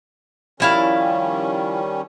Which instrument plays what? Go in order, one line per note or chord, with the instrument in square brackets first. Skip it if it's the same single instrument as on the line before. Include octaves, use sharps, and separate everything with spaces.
[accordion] D#3 G3 C#4 [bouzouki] F3 E4 F5